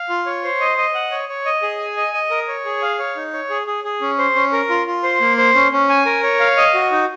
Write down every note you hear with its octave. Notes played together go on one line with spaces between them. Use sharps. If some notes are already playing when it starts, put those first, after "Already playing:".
Already playing: F5
F4
C#5
C5
D#5
D#5
F#5
C#5
C#5
D#5
G#4
G#5
D#5
D#5
A#4
C#5
G#4
F5
C#5
D#4
C#5
G#4
G#4
G#4
C#4
C5
C#4
A#4
F4
F4
C5
A#3
C5
C#4
C#4
G#5
A#4
C#5
F5
D#5
F#4
D#4